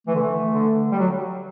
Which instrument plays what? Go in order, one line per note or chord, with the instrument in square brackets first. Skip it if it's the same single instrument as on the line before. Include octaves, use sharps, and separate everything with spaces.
[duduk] E3 [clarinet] A3
[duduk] D3
E3
D3
G3
F#3